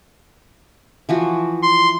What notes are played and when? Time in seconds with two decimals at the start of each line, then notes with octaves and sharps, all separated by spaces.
1.09 E3 F3 F#4
1.63 C6